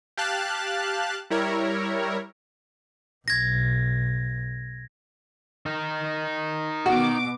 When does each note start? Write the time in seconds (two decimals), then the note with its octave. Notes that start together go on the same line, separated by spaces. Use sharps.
0.17 G4 F5 A5 F#6
1.30 G3 E4 A#4 C#5
3.28 B1 G#6 A#6
5.66 D#4 A#4
6.86 B2 F#4 D6